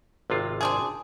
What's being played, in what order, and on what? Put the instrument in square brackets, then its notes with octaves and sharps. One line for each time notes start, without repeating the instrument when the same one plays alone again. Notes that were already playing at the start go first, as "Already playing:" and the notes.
[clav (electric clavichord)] G#1 C3 F4
[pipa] C4 D4 G#4